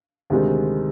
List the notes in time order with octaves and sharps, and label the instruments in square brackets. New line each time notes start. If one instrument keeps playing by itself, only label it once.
[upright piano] D2 C3 D#3 G#3 D#4